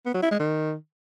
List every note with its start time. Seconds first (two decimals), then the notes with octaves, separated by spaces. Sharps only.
0.06 B3
0.14 F#3
0.22 E4
0.31 G#3
0.39 D#3